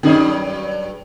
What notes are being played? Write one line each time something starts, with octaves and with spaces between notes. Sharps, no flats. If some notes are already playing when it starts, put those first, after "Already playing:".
G2 D#3 F#3 C#4 D#4 G#4